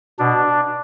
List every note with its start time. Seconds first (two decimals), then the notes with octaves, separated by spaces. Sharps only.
0.19 B2 D4